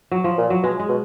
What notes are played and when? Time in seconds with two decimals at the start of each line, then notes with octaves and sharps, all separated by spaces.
0.11 F#3
0.24 F3
0.38 A#2
0.50 F#3
0.63 B2 G#3
0.79 G#3
0.89 B2